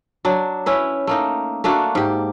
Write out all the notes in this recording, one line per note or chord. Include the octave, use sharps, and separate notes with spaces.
F#3 D4
C#4 E4 B4
A3 A#3 D#4
A3 A#3 D4 F#4
G#2 G4